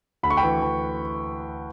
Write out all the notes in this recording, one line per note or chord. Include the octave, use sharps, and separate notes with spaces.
D2 B5
C#6
G5 B5
E3
E3